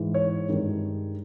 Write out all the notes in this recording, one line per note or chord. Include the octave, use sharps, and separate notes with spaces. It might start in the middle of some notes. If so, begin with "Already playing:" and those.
Already playing: G#2 E3 G#3
C#5
G2 D#3 G#3